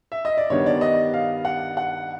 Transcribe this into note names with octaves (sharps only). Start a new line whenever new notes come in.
E5
D#5
D5
G2 D#3 G3 B3 D4 C#5
D5
D#5
F5
F#5
F#5